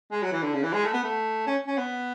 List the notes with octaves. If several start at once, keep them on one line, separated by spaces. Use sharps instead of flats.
G#3
F#3
E3
D3
C#3
E3
G#3
A3
B3
A3
C#4
C#4
B3